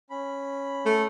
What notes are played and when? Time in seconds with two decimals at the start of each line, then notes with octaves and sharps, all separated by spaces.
0.10 C#4 B5
0.86 A3